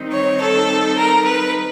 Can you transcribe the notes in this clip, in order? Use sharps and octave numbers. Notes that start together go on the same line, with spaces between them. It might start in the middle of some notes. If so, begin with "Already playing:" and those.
Already playing: D#3 G3 C4 D#4
C#5
A4
A#4
B4